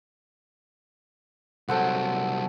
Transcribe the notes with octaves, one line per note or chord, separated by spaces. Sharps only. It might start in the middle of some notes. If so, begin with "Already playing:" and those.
C2 F#3 A4 C5 F#5